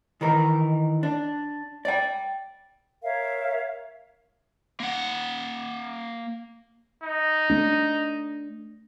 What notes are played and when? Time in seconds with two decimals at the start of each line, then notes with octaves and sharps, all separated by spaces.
0.21 D#3 E3 A#4
1.03 D4
1.85 D5 G5
3.04 A#4 C#5 E5 F5
4.80 A#3 F#5
7.03 D#4
7.50 A3 D4